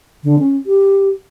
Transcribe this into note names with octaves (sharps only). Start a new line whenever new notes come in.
D3
C#4
G4